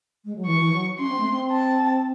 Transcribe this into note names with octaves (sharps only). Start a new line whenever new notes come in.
G#3
F#3
E3 C#6
E3
F#3
C#4 C6
C4
A3
C4
A5